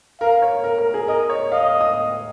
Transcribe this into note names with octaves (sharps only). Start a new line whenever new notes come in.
A#4 F5
C#5
A#4
A#4
G#4
A#4 D#5
C#5
D#5 F5
D#6